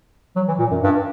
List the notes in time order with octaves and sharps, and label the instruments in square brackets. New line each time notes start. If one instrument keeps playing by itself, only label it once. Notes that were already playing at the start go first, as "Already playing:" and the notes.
[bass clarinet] F#3
E3
A#2
F#2
G2